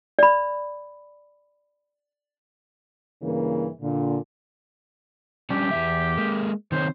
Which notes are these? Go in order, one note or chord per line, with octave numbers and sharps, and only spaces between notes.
D5 B5
G2 C#3 E3 A#3
A#2 D3
G3 C#4 D4 G4
E2 E3 E5
G#3 A#3
D#3 C4 C5 C#5